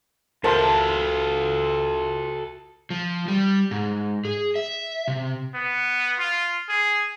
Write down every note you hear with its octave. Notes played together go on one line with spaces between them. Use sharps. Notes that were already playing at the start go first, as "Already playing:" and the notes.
F4 F#4 A4 A#4 C5 E5 F5 A5
F3
G3
G#2
G#4
E5
C3
B3
F4
G#4